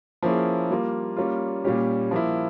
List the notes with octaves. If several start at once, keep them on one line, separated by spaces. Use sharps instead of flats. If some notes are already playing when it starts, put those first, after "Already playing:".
F3 A#3 C#4 E4 G#4
G3 A#3 F4
G3 A#3 C#4 F4
A#2 G3 C#4 G4
F3 A#3 E4